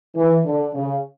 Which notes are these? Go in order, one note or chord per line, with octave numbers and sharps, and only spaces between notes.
E3
D3
C#3